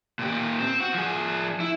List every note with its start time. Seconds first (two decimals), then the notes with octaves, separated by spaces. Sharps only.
0.19 A#2 G4
0.60 C4
0.80 F#4
0.94 F3 G#4
1.60 E4